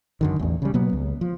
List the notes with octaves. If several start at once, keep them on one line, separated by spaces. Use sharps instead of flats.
F#2 D3 D#3
A1 E2
C#3 G3
B2 F#3 A#3 B3
C#2
F3